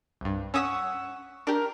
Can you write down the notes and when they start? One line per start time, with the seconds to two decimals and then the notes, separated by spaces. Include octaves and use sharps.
0.21 C2 G2
0.54 C#4 F#5 C#6 D#6 E6 B6
1.47 D4 G4 A#4